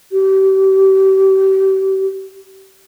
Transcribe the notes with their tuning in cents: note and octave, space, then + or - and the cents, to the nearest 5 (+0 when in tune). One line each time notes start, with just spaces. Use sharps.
G4 -35